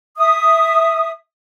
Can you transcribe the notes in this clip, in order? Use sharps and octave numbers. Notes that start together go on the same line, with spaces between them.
E5 D#6